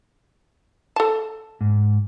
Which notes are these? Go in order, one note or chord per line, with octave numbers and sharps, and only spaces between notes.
A4 A5
G#2